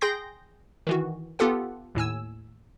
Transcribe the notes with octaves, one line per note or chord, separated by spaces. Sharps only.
G#4 G5 C6 G6 A#6
D#3 E3 F#4
B3 F4 G4 A4 F#5
D#2 A2 G#5 E6